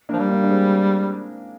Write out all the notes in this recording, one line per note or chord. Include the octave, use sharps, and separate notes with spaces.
A#3 D4
F3
G3
A#3 D4
D4
G#3 C4